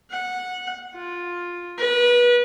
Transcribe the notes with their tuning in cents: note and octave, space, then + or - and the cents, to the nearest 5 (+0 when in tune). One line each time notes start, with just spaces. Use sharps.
F#5 -15
F4 +10
B4 -30